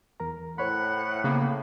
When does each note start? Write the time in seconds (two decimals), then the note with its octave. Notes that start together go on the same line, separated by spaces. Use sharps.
0.20 E2 A#4 A#5
0.58 A2 C5 C#5 F#5 B5
1.24 C#3 A#3 B3